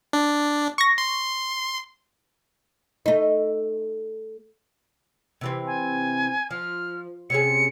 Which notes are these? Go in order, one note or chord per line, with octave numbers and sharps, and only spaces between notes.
D4
C#6 A#6
C6
A3 D#4
C3 E3 C4
G#5
F3 F6
C3 C#4 G#4 C#7